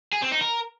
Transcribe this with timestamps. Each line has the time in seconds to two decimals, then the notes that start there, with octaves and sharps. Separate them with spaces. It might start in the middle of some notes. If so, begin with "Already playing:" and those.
0.13 G#4
0.22 C4
0.32 D#4
0.41 A#4